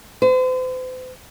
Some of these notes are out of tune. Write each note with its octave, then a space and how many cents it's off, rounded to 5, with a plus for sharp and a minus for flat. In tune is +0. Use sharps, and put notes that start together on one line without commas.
C5 -40